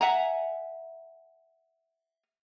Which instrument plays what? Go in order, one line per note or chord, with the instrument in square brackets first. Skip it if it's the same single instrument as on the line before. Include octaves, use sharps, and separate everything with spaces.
[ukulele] E5 F#5 G#5 A#5